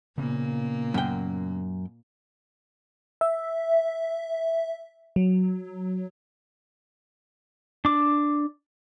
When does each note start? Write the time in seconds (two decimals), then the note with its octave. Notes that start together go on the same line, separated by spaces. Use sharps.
0.18 A#2 C#3 A#3 B3
0.94 F#2 G5
3.21 E5
5.16 F#3
7.85 D4 D6